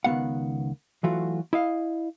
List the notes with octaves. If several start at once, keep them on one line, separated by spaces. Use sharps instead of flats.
C#2 D#3 F#3 B3 F5 F#5
E3 F#3 A3 F4 F#4
E4 D#5 F5